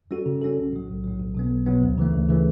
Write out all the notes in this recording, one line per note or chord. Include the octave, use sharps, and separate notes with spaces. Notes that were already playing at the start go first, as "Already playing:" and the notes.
G3 C#4 F#4 A4
C#3
G3 C#4 F#4 A4
B1
A2 F#3
B1
A2 F#3
B1
B2 F#3 B3
B1
B2 F#3 B3
D2
C#3 E3 A3
D2
C#3 E3 A3